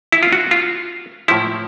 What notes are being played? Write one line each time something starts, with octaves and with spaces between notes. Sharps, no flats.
E4
F4
F#4
F4
A2 F3 E4